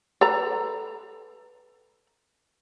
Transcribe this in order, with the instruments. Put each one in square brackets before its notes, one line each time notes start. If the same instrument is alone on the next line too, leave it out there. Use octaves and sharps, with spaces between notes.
[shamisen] A4 B4 A#5